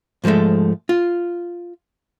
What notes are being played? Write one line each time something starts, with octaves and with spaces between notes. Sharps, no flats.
G#2 F3 F#3 G#3 A3
F4